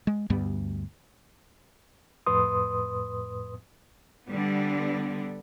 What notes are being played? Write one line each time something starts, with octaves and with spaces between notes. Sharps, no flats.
G#3
D2 G2 G3 B3
F2 A2 B4 C6 D#6
D3 G3 B3